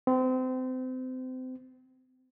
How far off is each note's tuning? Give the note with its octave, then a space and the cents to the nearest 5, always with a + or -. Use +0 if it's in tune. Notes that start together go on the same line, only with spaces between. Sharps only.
C4 -30